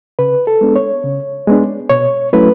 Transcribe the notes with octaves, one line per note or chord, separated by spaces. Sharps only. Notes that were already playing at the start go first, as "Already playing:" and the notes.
C#3 B4
A4
G#3 B3 D4
C#5
C#3
G#3 B3 D4
B2 C#5
F#3 A3 C#4 E4 B4